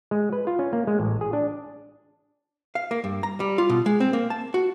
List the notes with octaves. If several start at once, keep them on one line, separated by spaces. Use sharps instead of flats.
G#3
B4
F4
C#4
A#3
G#3
A1
G#4
D4
F5
A#3
G2
A#5
G3
F4
B2
G#3
C4
A#3
A5
F#4